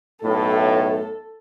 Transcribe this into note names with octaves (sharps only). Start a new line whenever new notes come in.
B1 A2 A4